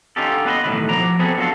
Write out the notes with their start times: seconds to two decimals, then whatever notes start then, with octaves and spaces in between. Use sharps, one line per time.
0.16 D3 C#4 D#4 F4 G4 A4
0.46 B3 B4 C5 D#5
0.64 B1 F2 A2 D#3 E3 B4
0.89 F3 F#4 D5 A#5
1.19 B3 C4 F#4 G#4 A4 B4
1.37 D3 F#3 F4 F#4 A4